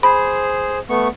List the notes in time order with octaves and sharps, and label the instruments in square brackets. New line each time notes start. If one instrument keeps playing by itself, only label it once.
[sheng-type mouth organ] G#4 C5 [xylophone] B5
[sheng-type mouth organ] A3 B3 C#6